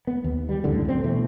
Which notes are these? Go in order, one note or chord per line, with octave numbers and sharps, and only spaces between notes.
B3
D#2
G3
C#2 F#2 A2 D3
D1 C4
E2 B2 E3 A3